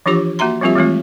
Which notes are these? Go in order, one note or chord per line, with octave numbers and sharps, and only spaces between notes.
E3 F3 D4 F4 G4 D6
A#3 F#4 E5 A#5 C6
F3 G3 C4 F4 G4 E5
E3 G#3 A3 C4 F4